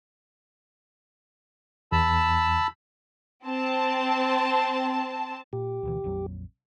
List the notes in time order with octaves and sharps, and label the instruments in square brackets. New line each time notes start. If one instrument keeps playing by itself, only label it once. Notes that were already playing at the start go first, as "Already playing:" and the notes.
[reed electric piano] E2 [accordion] A5 B5 E6
[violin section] C4 A5
[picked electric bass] A#2 [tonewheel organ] G4
[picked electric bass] D2 B2 E3
A#1 F2 F#3